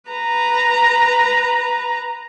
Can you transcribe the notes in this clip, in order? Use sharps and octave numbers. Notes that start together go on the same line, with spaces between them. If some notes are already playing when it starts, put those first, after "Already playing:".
B4 A#5